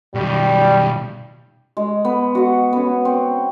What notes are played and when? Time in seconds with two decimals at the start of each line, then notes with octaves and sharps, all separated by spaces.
0.15 B2 D#3 G3
1.77 G#3
2.05 B3
2.35 F#4 F#5
2.73 B3 C#4
3.05 C4